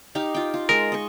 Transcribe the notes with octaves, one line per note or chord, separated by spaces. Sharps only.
D#4 G4 F5
F4 G5
F4
G#3 A#4
D#5 C#6